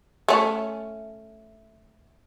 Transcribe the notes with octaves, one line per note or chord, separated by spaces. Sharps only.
A3 C#4